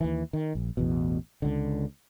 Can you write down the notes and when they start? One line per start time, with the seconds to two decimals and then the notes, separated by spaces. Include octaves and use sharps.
0.01 D#2 E3
0.33 D#3
0.55 A#1
0.77 A1 E2 B2
1.42 C#2 D3